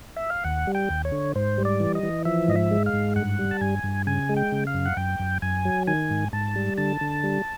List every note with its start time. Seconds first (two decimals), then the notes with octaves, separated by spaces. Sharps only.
0.16 E5
0.30 F5
0.44 D#2 F#5
0.67 G3
0.75 G5
0.90 D#2
1.05 C#5
1.12 D3
1.35 G#2 C5
1.58 G3
1.65 D5
1.80 E3
1.95 D#5
2.03 E3
2.25 F3 E5
2.48 G#2 D#5
2.56 E5
2.71 G#3
2.86 F5
2.93 G#2
3.16 G2 F#5
3.39 G3
3.51 A5
3.61 G2 G#5
3.84 G2
4.07 C#3 G#5
4.29 G#3
4.37 G5
4.52 C#3
4.67 F5
4.74 F#2
4.86 F#5
4.97 F#2 G5
5.20 F#2
5.42 F#2 G#5
5.65 F#3
5.87 D#3 G#5
6.10 G#2
6.33 G#2 A5
6.56 G3
6.78 D3 A5
7.01 D3
7.24 G3